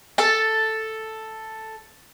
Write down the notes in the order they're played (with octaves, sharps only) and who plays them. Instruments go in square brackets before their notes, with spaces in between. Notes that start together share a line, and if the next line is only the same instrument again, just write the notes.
[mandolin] A4 A5